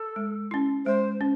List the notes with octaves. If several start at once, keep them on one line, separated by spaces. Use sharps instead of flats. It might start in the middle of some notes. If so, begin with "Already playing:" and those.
Already playing: A4
G#3
C#4 E4
G#3 C5
C#4